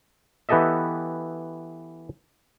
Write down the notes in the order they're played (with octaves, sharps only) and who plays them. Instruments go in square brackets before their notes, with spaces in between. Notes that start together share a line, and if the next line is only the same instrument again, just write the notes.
[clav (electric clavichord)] E3 B3 G4 A4 D#5 E5